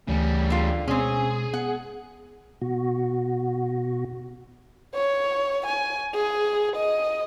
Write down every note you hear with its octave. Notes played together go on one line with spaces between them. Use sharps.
D2 C#3 E3 G3 A3
D3 F4
B2 G#3 C4 C#4 G#4
B3 F#5
B2 F#4
C#5
G#5
G#4
D#5